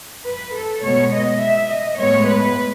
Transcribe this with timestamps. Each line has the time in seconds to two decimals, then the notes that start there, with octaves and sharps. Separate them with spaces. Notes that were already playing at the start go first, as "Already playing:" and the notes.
0.27 B4
0.55 A4
0.84 B2 G#3 B3 C#5
1.13 D#5
1.42 E5
1.70 D#5
1.98 A2 G#3 B3 C#5
2.27 B4